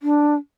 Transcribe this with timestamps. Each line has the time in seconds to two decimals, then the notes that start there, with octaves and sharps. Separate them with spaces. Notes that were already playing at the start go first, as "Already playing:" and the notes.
0.03 D4